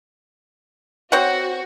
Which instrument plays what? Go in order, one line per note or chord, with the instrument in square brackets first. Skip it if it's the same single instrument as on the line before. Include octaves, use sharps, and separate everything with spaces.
[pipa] C4 C#5 F#5 [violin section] F#4